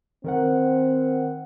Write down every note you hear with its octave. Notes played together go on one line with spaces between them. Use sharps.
D#3 C4 A#4 F#5